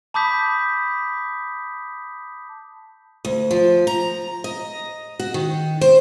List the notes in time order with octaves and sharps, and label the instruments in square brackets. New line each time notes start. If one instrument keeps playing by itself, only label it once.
[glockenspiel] A5 B5 D6 D#6 G6 B6
[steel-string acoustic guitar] D2
F3
A#5
D#5
F#4
D#3
C5